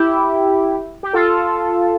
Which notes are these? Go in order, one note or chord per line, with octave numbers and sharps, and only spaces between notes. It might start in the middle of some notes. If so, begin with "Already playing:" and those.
Already playing: E4 G4
G4
F4 A4